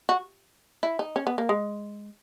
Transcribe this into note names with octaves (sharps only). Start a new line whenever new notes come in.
F#4
E4
D#4
C#4
B3
A#3
G#3